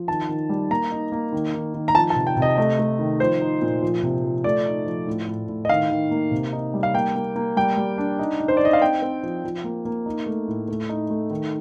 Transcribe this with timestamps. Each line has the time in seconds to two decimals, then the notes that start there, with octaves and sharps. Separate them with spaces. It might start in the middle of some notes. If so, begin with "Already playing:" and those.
Already playing: F3
0.08 D#3 A5
0.29 D#3
0.49 G3
0.70 A#3 A#5
0.92 D#4
1.12 A#3
1.32 D#3
1.54 D#3
1.74 D#3
1.88 A#5
1.95 F3 A5
2.10 A5
2.16 C3
2.27 G5
2.37 C3
2.42 D#5
2.58 A3 D#5
2.79 A3
2.99 D#3
3.20 F3 C5
3.41 D#4
3.62 A#2
3.82 F3
4.03 C3
4.24 F3
4.44 A3 D5
4.65 D#4
4.86 F3
5.07 A2
5.27 A2
5.49 A2
5.65 D#5
5.69 D#3 F5
5.91 D#3
6.11 A#3
6.31 C3
6.53 D#4
6.74 G3
6.83 F5
6.94 A#3 G5
7.16 A#3
7.36 A#3
7.57 G3 G5
7.77 G3
7.98 D4
8.19 D#4
8.40 D#4
8.48 C5
8.57 D#4 D5
8.65 D#5
8.73 F5
8.81 C4 G5
9.02 C4
9.23 F3
9.44 F3
9.64 A#3
9.85 A#3
10.06 D#4
10.26 A3
10.48 A2
10.68 A3
10.89 D#4
11.10 A3
11.30 D#3